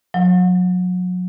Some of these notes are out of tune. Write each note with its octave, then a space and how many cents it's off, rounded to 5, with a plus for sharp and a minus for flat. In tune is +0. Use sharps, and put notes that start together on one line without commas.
F#3 -35